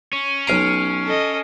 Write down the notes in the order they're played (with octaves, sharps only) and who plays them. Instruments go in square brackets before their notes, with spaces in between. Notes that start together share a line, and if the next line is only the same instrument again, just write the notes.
[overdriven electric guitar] C#4
[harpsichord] B1 A#5 [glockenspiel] F6 C7 D7
[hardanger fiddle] A4 D#5